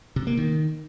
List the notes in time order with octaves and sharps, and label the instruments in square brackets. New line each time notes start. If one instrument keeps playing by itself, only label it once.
[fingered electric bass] C3
A#3
D#3